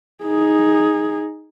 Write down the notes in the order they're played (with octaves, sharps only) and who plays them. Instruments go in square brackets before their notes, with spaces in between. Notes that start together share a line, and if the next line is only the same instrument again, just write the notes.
[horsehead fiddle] D#4 G#4